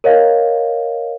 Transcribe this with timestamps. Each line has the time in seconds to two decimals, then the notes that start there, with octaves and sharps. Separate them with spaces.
0.04 A#4 C#5 D#5 F5